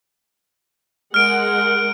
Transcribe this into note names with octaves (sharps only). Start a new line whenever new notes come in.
G#3 A#4 F#5 F6 D7